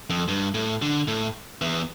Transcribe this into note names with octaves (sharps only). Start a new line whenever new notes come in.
F2
G2
A2
D3
A2
E2